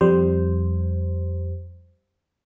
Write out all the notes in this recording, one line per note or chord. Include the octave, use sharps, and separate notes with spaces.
F2 G3 C5